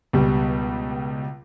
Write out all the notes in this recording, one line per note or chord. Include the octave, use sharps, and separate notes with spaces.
C#2 B2 G3